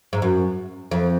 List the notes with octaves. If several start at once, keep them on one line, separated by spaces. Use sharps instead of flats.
G#2
F#2
F2